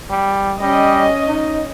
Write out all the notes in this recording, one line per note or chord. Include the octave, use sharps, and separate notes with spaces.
G3
G3 C#4 D#5
D#4